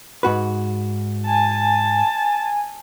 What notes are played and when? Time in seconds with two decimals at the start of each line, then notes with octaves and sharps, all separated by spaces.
0.23 G#2 F#4 B4
1.26 G#5 A5